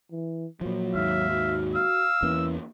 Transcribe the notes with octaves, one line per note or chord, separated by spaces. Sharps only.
E3
A#2 F3 F#3
D#2 G#2 E5 F5
F#4
F5 E6
E2 E3 A#3 C#4